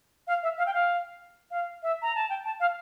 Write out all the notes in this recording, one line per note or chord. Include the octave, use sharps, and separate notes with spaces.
F5
E5
F5
G5
F5
F5
E5
A#5
A5
G5
A5
F5